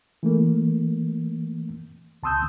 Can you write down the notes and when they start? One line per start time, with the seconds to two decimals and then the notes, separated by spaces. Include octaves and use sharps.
0.23 E3 A3 A#3
2.23 C#2 A5 C6 D#6 E6 G6